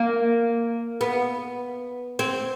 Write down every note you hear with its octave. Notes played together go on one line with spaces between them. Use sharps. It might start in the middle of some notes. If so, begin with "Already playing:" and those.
Already playing: A#3
B3
C4